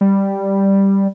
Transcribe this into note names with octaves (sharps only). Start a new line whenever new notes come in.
G3